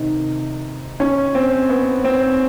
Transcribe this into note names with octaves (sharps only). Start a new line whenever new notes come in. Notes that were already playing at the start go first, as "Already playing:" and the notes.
Already playing: C3 D#3 D#4
C#4
C4
B3
C4